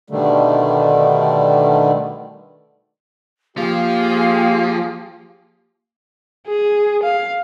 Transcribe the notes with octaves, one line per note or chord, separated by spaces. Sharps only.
B2 D3 D#3 G3 A3
F3 A#3 G4 G#4 F5
G#4
F5